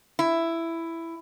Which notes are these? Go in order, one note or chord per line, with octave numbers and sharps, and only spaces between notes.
E4